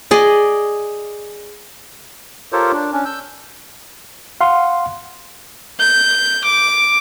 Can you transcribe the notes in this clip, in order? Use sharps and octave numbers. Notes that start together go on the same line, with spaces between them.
G#4 D5 D#5
F4 G4 A4 A#4 C5 C#5
D4
C#4 D4
E6 G6
F5 F#5 C6
G6
D6